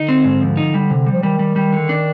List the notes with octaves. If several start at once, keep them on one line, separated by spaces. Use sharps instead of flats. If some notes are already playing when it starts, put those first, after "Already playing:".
Already playing: D3 D#4
C4
G#2
F3
D#4
G3
C3
G3
F3
D#3 G3
G3
G3
D3
D4